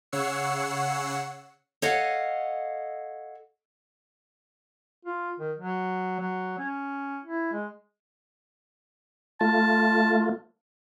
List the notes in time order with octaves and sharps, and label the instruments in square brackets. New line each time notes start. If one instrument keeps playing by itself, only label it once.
[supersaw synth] C#3 C#5 F#5 E6 C7 C#7
[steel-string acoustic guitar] A4 C#5 D#5 F5 F#5
[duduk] F4
D#3
F#3
F#3
C#4
E4
G#3
[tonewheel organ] A3 F4 [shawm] A5